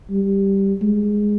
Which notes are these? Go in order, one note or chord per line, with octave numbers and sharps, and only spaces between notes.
G3
G#3